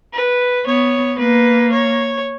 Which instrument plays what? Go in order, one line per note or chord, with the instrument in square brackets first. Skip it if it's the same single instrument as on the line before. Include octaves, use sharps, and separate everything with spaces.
[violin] B4
[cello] B3 [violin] C#5
[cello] A#3 [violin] B4
[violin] C#5